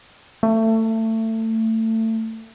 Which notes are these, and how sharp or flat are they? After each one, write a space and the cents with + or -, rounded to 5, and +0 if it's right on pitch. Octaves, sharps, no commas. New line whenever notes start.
A3 +25